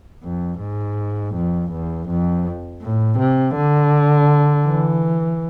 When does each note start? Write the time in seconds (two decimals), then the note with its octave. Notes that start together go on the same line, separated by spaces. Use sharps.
0.24 F2
0.60 G#2
1.35 F2
1.72 E2
2.09 F2
2.82 A2
3.18 C3
3.55 D3
4.66 E3